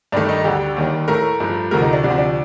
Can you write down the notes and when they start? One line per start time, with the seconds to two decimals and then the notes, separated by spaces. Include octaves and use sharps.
0.12 G2 D#3 A3 D4
0.29 D#4
0.44 D2 D3 G3 G4
0.76 D#2 D#3 G3
1.08 A2 A3 A#4
1.40 G2 F3 A3
1.71 D2 C3 F3 A3 A#4
1.82 D#4
1.93 D4
2.03 D2 C3 F3 D4
2.10 C4
2.18 D4